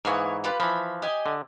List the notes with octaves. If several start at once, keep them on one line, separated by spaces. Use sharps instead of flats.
G#2 E3 A#3 B3 C#5
F4 G4 B4
E3 F3 B5
G4 D#5 G#5
D3